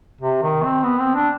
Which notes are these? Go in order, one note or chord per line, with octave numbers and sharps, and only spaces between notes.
C3
D#3
C4
B3
C4
D4